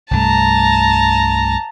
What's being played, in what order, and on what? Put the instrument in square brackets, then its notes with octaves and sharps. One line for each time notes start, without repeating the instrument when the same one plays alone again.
[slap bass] C2 G2 A3 [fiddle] A5 A#5